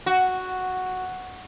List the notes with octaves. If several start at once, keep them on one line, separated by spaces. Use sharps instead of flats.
F#4